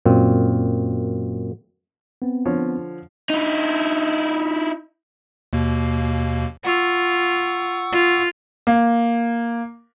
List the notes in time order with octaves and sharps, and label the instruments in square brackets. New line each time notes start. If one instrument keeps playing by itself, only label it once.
[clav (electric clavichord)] F#2 A#2 C4
[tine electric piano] B3 C4
[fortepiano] D3 F3 C#5
[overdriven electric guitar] D#4 E4
[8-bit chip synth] D#2 B2 A#3
[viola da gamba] F4 [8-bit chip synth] F#5 C#6 E6
[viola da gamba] F4
[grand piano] A#3